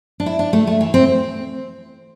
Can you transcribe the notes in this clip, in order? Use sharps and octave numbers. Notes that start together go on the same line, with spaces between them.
D4
E4
D4
A3
A3
E3
C4